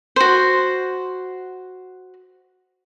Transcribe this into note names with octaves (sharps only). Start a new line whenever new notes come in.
F#4 C5